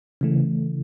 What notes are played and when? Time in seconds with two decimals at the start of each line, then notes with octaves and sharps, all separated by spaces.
0.21 C#3 E3 A3